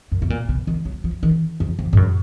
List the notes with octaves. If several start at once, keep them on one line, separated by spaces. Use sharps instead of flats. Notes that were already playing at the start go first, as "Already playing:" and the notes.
F#2
B2
A#2
B2
D#3
F#3
F3
D#3
F2
F2
G#2
F#2